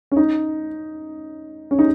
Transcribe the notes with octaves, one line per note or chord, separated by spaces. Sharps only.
C#4
D#4
C#4
D#4